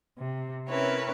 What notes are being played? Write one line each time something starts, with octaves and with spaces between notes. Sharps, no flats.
C3
C4 C#4 E4 A#4 B4 C#5